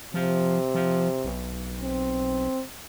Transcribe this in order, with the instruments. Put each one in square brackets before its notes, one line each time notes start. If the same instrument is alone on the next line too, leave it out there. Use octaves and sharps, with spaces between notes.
[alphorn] C3 [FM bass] F3
[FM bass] F3
B1
[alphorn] C4